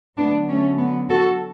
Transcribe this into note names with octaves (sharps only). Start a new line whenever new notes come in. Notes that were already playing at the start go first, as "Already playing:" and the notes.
D3 F#3 A3 B3 D4
A3 C#4
B3
F#4 A4